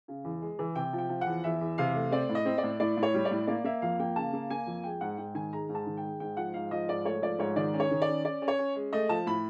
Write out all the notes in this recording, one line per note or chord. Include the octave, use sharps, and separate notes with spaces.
C#3
E2
G#3
E3
C3 G5
F3
G5
F3
F#5
E2
E2 E5
E2
C3 F5
A3
C4 D5
A2
D#5
C4
D5
A2
A2 D5
A2
C#5
G3
D5
A2
A#3 D5
A#3 E5
F2 F5
A#3 G5
C#3 A5
A#3
A#3 G#5
F2
G#3 G5
G#2 F#5
G#2 G5
D#3 G#5
G#3 A#5
G#2
A5
D#3
G5
G#3
G#2 G5
F3 F#5
G#2 F5
F3 D#5
G#2 D5
A3 C#5
F3 D5
G#2 C#5
D#3 D5
C#4
C#5
D#3
D5
C#4
C#4 D5
C#4
C#5
C#4
G#3
A3 D#5
F3 A5
A2 B5